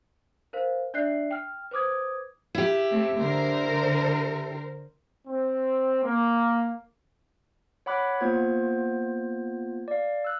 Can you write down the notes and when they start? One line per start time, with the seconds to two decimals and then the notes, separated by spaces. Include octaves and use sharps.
0.53 A#4 C5 F5
0.94 D4 D5 E5 F#6 C7
1.31 G5 F6
1.71 B4 C5 D6 D#6 G#6
2.55 E4 G4
2.90 A3 C4
3.18 D3 A#4 C5
5.28 C4
6.04 A#3
7.86 C#5 F#5 B5 D6 F#6
8.20 A#3 B3 F4 C5 G#6
9.88 D5 F5
10.25 E6 F#6